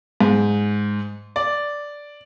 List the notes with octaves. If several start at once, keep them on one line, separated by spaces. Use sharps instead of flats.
G#2
D5